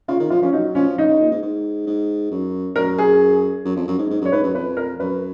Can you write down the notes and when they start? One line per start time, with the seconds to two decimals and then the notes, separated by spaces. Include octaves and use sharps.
0.08 C#3 F4
0.20 D#3
0.30 F3 F4
0.42 F3 C#4
0.53 F#3 D#4
0.75 F3 C#4
0.98 C#3 D#4
1.09 C#3
1.20 A#2
1.31 G#2
1.42 G#2
1.87 G#2
2.31 F#2
2.76 F#2 A#4
2.98 G#4
3.65 F#2
3.76 F2
3.88 F#2
3.98 G#2
4.10 G#2
4.21 F#2 C#5
4.32 G#2 B4
4.44 F#2
4.54 F2 B4
4.77 A#4
5.00 F#2 B4